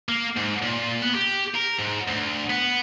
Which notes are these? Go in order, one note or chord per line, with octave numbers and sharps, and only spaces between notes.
A#3
G#2
A#2
B3
G4
A#4
G#2
D2
B3